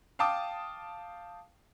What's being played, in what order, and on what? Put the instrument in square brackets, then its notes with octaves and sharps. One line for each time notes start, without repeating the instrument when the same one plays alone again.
[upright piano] F5 G5 A5 D6 D#6